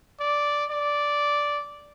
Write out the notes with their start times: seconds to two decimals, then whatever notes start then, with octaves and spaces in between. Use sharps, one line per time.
0.20 D5
0.71 D5